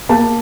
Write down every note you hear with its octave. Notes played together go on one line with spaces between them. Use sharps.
A#3 A5